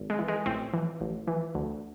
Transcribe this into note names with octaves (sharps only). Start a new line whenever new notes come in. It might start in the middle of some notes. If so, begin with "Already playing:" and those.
Already playing: G#1
G#3
E3
G#3
A1 C4
E3
A1
E3
D2